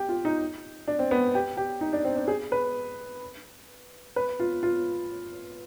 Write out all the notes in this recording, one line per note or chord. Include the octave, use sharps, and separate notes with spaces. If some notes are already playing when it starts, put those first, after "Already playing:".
Already playing: G4
F4
D#4
D4
C4
B3
G4
G4
D#4
D4
C4
D4
G#4
B4
B4
F4
F4